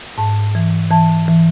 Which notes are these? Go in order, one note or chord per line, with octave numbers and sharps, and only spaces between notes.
G#2 A5
E3
E3 A5
E3